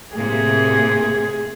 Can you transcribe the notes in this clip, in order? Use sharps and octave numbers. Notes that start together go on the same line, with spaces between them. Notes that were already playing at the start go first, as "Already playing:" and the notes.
A2 C3 A#3 G#4